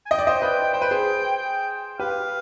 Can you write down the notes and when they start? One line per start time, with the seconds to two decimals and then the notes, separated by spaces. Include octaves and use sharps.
0.06 G#5
0.11 D#5 G5
0.19 D5
0.27 C5 D#5
0.42 B4 D5 G5
0.73 C5 G5
0.82 B4
0.91 G#4 C5
1.36 G5
2.00 G4 B4 F5